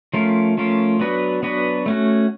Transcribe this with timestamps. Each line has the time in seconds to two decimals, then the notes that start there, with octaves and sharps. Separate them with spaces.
0.13 F3 A3 C#4 F4 A#4
0.57 F3 A3 C#4 F4 A#4
1.00 F#3 B3 D4 F#4 B4
1.43 F#3 B3 D4 F#4 B4
1.86 A3 C#4 F#4